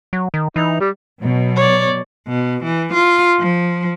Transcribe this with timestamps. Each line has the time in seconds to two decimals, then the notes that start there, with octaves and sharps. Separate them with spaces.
0.13 F#3
0.34 D#3
0.56 E3 D#4
0.80 G3
1.22 B2 F#3
1.56 C#5 D5
2.28 B2
2.64 E3
2.93 F4
3.40 F3